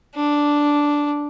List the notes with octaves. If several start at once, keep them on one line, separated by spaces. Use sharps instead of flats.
D4